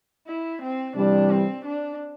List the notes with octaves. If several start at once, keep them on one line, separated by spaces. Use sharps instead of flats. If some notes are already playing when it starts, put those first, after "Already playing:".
E4
C4
C3 E3 G3 D4
C4
D4